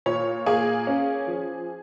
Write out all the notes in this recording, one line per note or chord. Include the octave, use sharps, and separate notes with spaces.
A#2 C#5
A#3 G#4
C#4
F3